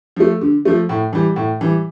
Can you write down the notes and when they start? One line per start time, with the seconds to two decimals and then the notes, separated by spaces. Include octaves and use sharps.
0.16 F3 A3
0.41 D3
0.65 F3 A3
0.89 A2
1.13 E3 G3
1.36 A2
1.61 E3 G3